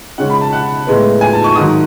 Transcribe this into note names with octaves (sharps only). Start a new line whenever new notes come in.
C#3 G#3 C#4 F#5
B5
A5
F#5
A2 G#3 B3
G#5
A5
C#6
G#2 D#3 F#3 D#6